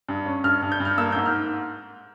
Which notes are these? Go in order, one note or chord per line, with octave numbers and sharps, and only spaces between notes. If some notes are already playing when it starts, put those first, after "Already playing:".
G2
C#4
G2 F6
G2
G6
G2
F6
A#3 E6
G#2 G6
F6